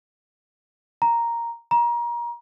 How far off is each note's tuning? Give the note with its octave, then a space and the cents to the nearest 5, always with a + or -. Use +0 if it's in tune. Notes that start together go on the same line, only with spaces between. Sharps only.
A#5 +0
A#5 +30